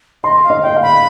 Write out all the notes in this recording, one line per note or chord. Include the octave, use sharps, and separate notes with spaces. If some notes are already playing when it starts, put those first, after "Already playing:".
D#5 C6
F5
D#5
D#5 G5
F5
B5